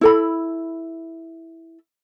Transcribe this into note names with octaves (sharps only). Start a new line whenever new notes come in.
E4 A4 B5